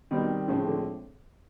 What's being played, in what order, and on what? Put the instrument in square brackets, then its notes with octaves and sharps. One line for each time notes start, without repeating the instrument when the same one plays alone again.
[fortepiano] B2 [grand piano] D#3 G3 C4
[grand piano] A2 F3 G#3 C4 [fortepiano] C#3
[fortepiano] D3